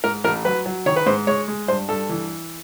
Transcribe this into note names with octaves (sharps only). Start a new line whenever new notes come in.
G#2 A#4
A1 A#4
F#3 B4
F#3
D#3 C#5
B4
G#2 C5
G#3 C#5
G#3
G2 C5
G2 A4
E3